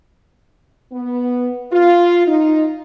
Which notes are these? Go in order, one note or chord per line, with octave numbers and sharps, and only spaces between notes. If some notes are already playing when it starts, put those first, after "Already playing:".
B3
F4
D#4